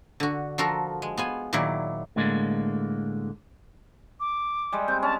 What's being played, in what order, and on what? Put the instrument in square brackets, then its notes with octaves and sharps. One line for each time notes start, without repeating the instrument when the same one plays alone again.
[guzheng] D3 F#4
F3 F4 F#4 A4 A#4
G#3
B3 F4 G#5
A#2 D#3 F#3 E4 D5
[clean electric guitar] A2 D3 G#3 A#3
[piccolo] D6
[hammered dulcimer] G3 G#3
[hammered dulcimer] C4 [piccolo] G6
[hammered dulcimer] C#4 [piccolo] A5